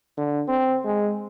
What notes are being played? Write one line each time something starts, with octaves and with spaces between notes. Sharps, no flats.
D3
C4
G#3